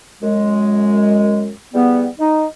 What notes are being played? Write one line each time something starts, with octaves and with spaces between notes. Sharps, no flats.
F#2 G#3
E2 G3 B3
D#4